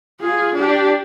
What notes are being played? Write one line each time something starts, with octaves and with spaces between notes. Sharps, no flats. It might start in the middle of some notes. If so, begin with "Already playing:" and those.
F4 G#4
D4 G4